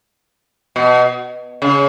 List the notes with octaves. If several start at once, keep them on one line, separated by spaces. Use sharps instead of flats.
B2
C#3